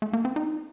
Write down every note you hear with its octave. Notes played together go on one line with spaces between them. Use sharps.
A3
A#3
C4
D#4